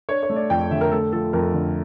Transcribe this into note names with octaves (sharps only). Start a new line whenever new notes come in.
D4 C#5
C#5
A3
D5
F2 G5
D3 E5
A#4
A3 A4
F3 A4
F2 A#4
D3